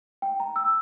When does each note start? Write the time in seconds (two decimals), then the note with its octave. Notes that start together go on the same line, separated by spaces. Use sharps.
0.22 G5
0.40 A#5
0.56 E6